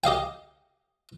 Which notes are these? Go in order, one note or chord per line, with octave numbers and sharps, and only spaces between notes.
G4 D#5 F5 G5